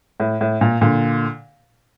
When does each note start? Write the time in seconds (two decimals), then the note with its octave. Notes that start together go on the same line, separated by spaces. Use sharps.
0.20 A2
0.41 A2
0.61 A#2
0.81 A#2 D3